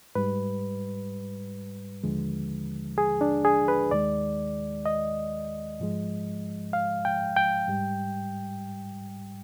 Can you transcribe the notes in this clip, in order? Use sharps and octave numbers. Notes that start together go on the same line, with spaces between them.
G#2 G3 B4
D#2 D3 F3 G#3
G#4
D4
G#4
B4
D#2 D#3 G#3 D5
D#5
G#2 F3 G#3
F5
G5
G5
G#2 G3